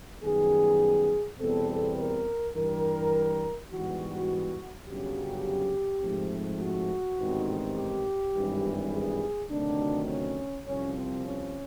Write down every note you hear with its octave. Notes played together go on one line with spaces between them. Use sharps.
F#2 D#3 G3 B3 G#4
E2 B2 G3 C4 A4
A#4
G2 E3 G3 A#4
G#2 E3 G3 B3 F#4
G1 F#2 C#3 F#3 G4
G#2 F3 A3 C4
F#4
A1 G#2 D#3 G3 C4
G4
G#1 G2 E3 G3
G#4
D2 C3 D#3 F#3 D4
C#4
C2 C3 F3 C#4
C4
C#4